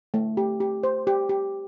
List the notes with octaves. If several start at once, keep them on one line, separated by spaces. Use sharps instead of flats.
A3
G4
G4
C5
G4
G4